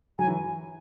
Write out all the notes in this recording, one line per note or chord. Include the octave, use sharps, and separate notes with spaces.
F#3 G#5
E3